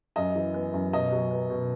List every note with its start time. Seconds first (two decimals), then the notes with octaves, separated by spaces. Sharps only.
0.16 F#2 D#5
0.35 E3
0.54 B3
0.73 F#2
0.93 B2 D#5
1.12 F#3
1.31 B3
1.50 B2